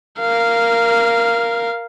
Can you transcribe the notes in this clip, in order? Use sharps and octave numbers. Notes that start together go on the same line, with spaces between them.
A#4 F5